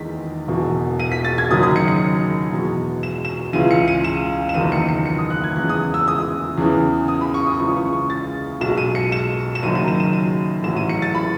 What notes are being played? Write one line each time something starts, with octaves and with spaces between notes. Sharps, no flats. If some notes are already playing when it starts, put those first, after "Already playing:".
Already playing: E2 D#3 G#3 A6 B6
E1 E2 B2
D#7
B6
A6
G#6
F#1 F#2 D#3 F#3 D#6
D#6
C#7
C#7
E2 B2 G#3
E7
E7
C#2 C#3 E3 D#7
C#7
D#7
E7
E7
F#1 E2 D#3 F#3 D#7
C#7
C#7
C#7
D#6
F#6
G#6
E2 C#3 G#3 F#6
D#6
E6
D#6
E2 C#3 E3
D#6
B5
C#6
D#6
C#2 C#3 E3 G#3 C#6
C#6
C#6
A6
B1 B2 G#3 E7
D#7
C#7
E7
E7
F#1 F#2 D#3 F#3 D#7
D#7
E7
D#7
E7
D#7
A1 A2 F#3 E7
D#7
C#7
A6
B5